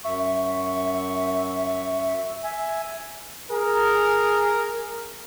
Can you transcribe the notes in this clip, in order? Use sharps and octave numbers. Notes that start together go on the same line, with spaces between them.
F#2 E5 C#6
E5 G#5
G#4 A#4